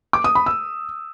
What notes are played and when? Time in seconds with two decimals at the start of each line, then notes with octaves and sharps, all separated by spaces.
0.13 D6
0.24 D#6
0.35 B5
0.46 E6